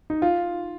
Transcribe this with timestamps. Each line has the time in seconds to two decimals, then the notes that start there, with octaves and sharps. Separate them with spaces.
0.10 D#4
0.22 F4